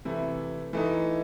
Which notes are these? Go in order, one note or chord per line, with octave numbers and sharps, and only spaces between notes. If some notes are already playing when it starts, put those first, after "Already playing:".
C3 E3 A3 E4
E3 A3 D#4